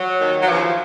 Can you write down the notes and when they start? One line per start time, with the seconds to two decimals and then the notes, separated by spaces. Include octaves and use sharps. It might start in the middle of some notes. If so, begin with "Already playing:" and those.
Already playing: F#3
0.19 D#2 D#3
0.41 F#3
0.47 D#2 C#3 E3 F3